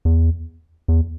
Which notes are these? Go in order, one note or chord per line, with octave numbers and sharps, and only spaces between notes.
E2
E2